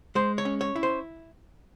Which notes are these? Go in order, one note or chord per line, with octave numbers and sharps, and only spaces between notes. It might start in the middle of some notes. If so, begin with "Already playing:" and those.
G#3 C5
C#5
C#4
C#5
E4
C5